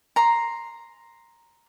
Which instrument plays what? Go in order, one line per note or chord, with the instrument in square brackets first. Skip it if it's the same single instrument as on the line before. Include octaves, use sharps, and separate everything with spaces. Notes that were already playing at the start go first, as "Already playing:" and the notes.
[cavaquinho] A#5 C6